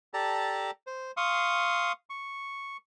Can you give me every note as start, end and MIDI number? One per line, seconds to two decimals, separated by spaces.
0.14 0.71 67
0.14 0.71 69
0.14 0.71 74
0.14 0.71 81
0.14 0.71 82
0.87 1.11 72
1.17 1.92 77
1.17 1.92 84
1.17 1.92 85
1.17 1.92 87
2.10 2.77 85